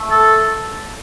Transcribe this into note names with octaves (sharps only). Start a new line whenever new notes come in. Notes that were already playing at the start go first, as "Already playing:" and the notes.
Already playing: A3
A4